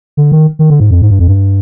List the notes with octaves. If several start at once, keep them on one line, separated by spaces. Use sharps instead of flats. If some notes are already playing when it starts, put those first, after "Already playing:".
D3
D#3
D#3
D3
G#2
F2
G#2
G2
F2
G2